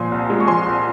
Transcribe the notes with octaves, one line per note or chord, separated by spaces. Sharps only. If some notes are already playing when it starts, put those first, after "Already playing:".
Already playing: A#2 F3 G#5 C6
C2
G#3
C#6
F3 G#5 C6
C2